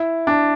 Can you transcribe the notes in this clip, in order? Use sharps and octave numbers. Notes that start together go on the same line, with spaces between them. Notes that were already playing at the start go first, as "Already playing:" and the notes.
Already playing: E4
D4